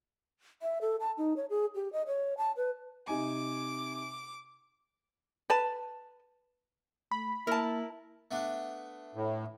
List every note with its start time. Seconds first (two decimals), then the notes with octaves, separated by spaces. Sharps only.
0.62 E5
0.81 A4
1.00 A5
1.18 D#4
1.37 C#5
1.50 G#4
1.75 G4
1.93 D#5
2.07 C#5
2.38 A5
2.57 B4
3.08 C3 D#4 G#5 D6
5.50 B4 A5
7.11 A3 B5
7.47 A#3 E4 A#4 A5
8.31 A3 B3 D4
9.15 A2